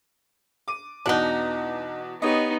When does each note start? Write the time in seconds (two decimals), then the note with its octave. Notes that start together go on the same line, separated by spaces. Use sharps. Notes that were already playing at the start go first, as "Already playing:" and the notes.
0.68 D6 D#7
1.06 E2 B2 D4 D#4 F#5
2.22 B3 D#4 G4 C#5 D#5